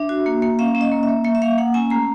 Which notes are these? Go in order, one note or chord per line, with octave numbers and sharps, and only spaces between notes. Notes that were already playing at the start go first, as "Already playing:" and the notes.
Already playing: D4 E5
F#4
A#3
A#3
C#4 F5
C#4
D#5
A#3
E5
A#3
A#3 E5
E5
A#3 F5
A#3 F#5
C#4 G#5
A3 A#5